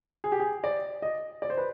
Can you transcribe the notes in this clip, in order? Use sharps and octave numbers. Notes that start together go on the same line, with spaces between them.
G#4
G4
G#4
D5
D#5
D5
C5
B4